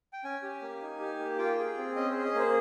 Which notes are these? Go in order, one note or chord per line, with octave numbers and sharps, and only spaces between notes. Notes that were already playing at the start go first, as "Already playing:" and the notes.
G5
C#4 G#5
G4
A#3
D#4
G4
A#3
F4 G5
G#4
C4
C#4 D#5
G#4 C5
D#5
A#3 C5